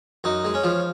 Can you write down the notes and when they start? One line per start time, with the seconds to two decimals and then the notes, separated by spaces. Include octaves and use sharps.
0.24 F#2 D#4
0.44 G#3
0.54 C#4
0.64 F3